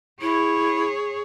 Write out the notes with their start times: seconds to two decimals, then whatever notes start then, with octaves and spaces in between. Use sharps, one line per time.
0.21 E4 G#4 C#5